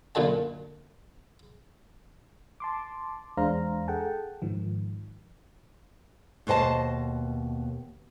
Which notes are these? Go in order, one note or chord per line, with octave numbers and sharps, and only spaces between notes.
F#2 A#2 D3 A5
A5 C6 D6
E2 G#3 D4 C5 F5 A#5
G#4 A4 F#5 G5 A5
G#2 D#3 F3
D#2 B2 C5 D#5 A5